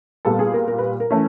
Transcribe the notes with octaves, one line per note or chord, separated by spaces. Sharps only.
A#2 G3 B3 A4
G#4
A#4
A#4
B4
A#4
E3 A3 C#4